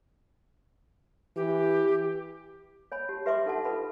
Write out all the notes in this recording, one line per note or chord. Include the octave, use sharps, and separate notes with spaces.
E3 G4
C#5 G#5 B5
G4 A5
G4 B4 E5 G#5 C6 D6
D#4 A4 F#5 A5
F4 A4 B4 B5